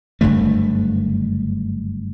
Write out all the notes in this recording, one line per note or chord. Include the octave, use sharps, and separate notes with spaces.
F#1 G2 D3 A3